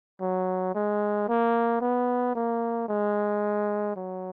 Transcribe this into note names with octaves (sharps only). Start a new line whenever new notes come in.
F#3
G#3
A#3
B3
A#3
G#3
F#3